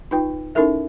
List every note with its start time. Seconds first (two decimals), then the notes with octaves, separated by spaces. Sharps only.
0.11 D#4 F4 B4 G5
0.55 C#4 D#4 E4 A4 A#4 E5